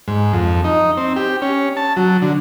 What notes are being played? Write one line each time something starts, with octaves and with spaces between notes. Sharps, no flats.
G#2
F2
D#4
C4
G4
C#4
A5
F#3
D3